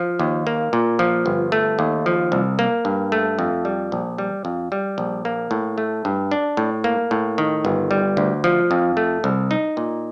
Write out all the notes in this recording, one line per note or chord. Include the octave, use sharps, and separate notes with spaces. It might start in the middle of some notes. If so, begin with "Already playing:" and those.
Already playing: F3
D#2
A#3
A#2
F3
G1
A3
D#2
F3
C2
A#3
G2
A3
F2
G3
A#1
G3
F2
G3
A#1
A#3
A2
A3
G2
D4
A2
A#3
A2
D#3
G1
G3
D2
F3
F2
A3
C2
D#4
A#2